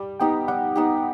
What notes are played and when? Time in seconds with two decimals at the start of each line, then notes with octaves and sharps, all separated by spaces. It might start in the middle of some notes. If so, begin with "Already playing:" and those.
Already playing: G3
0.20 B3 D#4 G4 G5
0.48 G3 F#5
0.75 B3 D#4 G4